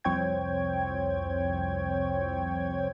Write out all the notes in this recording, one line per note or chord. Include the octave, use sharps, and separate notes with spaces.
C2 F2 C4 C#5 G5 G#6